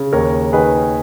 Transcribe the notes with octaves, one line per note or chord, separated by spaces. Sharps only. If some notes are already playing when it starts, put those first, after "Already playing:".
Already playing: C#3
D#2 A#4 C#5
D#3 G#4 B4